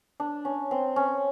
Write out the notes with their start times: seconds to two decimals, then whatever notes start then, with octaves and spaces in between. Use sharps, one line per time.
0.20 D4
0.45 C#4
0.71 C4
0.96 C#4